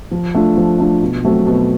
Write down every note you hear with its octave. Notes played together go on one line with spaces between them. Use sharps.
F3
A3 D4 F4
F3
A3 D4 F4
B2
F#3 A3 C4
B2